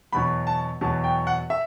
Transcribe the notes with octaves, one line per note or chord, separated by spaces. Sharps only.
E2 B2 F#3 B5
A5
E2 B2 F#3 A5
G5
F#5
E5